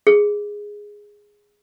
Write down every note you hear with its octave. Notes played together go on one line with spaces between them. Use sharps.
G#4